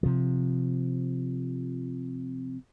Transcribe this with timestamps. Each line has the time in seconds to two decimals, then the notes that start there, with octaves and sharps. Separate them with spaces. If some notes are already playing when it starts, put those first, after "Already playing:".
0.03 C3 F3